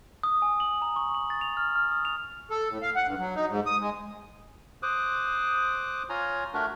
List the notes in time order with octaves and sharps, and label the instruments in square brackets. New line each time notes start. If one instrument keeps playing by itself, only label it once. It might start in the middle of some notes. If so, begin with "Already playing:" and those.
[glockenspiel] D#6
G#5
F#7
A#5
C#6
F#7
A6
F7
F6
F6
D#6
F7
[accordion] A4
A2
F5
F#5
G2
F#3
D#4
G#2
D#6
G#3
[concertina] C5 D6 D#6 F#6
F4 C#5 G#5 A#5
A3 D4 F#4 A#4